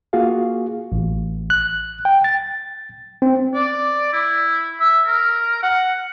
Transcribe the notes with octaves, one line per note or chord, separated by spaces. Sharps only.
A#3 F4 F#4 G#4 F5
A1
F#6
G5
A6
C4
D5
E4
E5
A#4
F#5